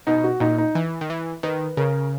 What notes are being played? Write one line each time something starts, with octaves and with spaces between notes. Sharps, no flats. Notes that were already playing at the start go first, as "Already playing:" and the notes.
B2 D#4
F#4
A#2 D#4
D#4
E3
D#3
E3
D#3 B4
C#3 A#4